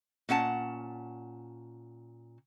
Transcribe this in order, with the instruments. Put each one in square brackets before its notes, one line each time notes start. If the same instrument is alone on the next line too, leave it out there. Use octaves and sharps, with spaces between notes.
[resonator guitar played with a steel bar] A#2 C#4 F#5 A5